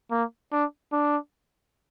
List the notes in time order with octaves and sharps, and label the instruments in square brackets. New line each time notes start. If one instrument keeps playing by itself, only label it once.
[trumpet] A#3
D4
D4